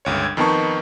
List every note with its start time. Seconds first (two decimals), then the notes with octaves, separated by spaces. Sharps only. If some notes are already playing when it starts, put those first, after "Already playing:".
0.05 G1 C#2 C#5
0.24 G#6
0.37 F2 D#3 B3 D#4 A5 C#6